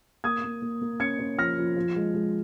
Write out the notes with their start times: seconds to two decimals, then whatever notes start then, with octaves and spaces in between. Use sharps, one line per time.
0.24 A#3 D#6 G#6
0.44 A#3
0.62 A#3
0.81 A#3
1.00 C#4 G#6 C#7
1.19 C#4
1.38 F3 F6 A#6
1.58 F3
1.76 F3
1.96 G#3
2.14 G#3